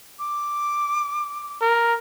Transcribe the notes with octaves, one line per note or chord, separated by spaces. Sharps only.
D6
A#4